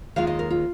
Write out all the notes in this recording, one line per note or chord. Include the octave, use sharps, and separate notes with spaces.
D#2 D#3 G#3 F4 F5
D#5
A#4
F4